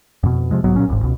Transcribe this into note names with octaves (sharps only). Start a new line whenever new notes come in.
F2 B2
C3 F3 G#3
B1 G#2 F#3 B3
A#2 F#3 C#4
D#1 G#1 G#2
C#2 B2